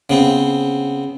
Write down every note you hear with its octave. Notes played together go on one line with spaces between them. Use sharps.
C#3 B3 C4